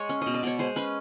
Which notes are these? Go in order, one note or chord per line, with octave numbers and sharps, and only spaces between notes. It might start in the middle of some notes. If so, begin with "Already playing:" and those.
Already playing: G#3 C#5
C#4
B2 D#5
D5
B2 C#5
G#3 C5
C#4 B4